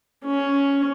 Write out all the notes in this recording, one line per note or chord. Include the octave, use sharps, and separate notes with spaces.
C#4